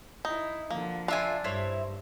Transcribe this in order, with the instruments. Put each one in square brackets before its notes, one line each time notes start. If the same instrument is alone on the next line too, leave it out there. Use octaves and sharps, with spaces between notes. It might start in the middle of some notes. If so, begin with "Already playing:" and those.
[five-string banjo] D#4 [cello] E4
[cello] D3 F3 [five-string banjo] A#3
[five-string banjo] D4 [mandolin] F4 E5 G#5
[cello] G2 [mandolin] E4 C5 C#5